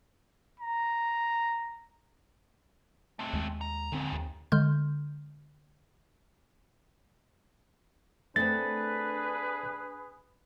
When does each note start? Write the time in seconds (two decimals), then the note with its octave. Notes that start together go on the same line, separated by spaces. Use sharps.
0.60 A#5
3.19 A3 C4
3.33 D#2 G#3
3.61 A#5
3.92 F2 G#2 D3 C4
4.12 D#2
4.52 D3 G#3 C6 F6 G6
8.36 A3 C4 D4 G#4 B4 A6